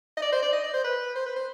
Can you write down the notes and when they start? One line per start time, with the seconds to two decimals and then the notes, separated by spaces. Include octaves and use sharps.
0.17 D#5
0.22 D5
0.32 C5
0.42 D5
0.53 D#5
0.63 D5
0.73 C5
0.84 B4
1.15 C5
1.26 B4
1.36 C5